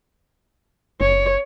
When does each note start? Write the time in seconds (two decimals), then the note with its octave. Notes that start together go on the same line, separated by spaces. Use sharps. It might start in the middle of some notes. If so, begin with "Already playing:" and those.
1.01 F#1 C#5